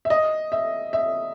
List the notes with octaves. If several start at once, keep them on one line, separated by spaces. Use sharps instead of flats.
E5
D#5
E5
E5